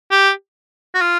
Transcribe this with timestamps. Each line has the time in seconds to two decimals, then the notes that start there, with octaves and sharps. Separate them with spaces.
0.11 G4
0.95 F#4
1.01 F4